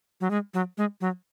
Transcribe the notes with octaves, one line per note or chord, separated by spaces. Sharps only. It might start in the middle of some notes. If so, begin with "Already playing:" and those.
F#3
G#3
F#3
G#3
F#3